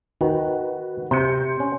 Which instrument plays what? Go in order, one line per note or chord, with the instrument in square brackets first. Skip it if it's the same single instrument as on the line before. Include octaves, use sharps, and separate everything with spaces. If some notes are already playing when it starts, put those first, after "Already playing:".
[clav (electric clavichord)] D#3 [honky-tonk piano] F#4 B4
[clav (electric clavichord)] C3 [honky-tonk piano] C6 G6 C#7
[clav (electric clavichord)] C#4